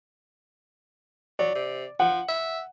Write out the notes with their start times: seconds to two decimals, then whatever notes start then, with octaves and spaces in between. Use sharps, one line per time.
1.39 F#3 D5
1.55 C3
2.00 F3 F#5
2.29 E5